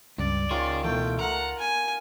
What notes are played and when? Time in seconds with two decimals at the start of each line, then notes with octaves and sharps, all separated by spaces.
0.18 C#2 G2 D5
0.50 D#3 F4 G#4 C#5 C6
0.84 B2 E3 A3 G5
1.19 A#4 F#5 A#5
1.58 G#5